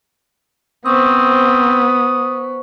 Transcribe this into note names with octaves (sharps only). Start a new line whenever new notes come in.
B3 C4 C5 C#6 D#6